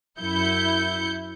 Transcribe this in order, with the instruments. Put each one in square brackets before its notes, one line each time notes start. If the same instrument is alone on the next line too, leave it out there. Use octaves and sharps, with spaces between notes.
[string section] F#2 E4 G6 C#7